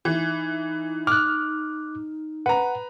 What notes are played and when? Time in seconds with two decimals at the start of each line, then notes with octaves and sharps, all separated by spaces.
0.05 E3 D#4
1.07 D6 F6 F#6
2.46 B4 F#5 A#5